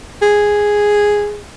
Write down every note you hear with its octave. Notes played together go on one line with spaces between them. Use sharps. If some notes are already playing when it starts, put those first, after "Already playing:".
G#4